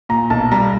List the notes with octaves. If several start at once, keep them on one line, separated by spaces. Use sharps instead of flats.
A#2 A#5
B1 A5
G3 A#5